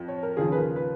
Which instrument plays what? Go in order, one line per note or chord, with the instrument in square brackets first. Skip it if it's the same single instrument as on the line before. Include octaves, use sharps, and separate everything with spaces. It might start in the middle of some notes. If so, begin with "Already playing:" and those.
Already playing: [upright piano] F2
C#5
A#4
D#2 C#3 F3 G#4
B4
A#4
B4